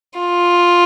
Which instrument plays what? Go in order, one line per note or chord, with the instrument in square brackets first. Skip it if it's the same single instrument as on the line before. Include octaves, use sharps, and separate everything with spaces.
[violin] F4